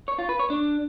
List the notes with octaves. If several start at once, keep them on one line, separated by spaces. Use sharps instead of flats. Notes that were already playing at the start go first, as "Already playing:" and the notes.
C#5
F4
B4
C#5
D4